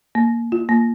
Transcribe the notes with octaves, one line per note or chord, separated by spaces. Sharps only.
A#3
F4
A#3